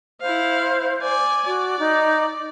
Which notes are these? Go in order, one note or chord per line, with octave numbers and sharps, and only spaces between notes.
E4 C5 F5
D5 G#5
F#4 D5
D#4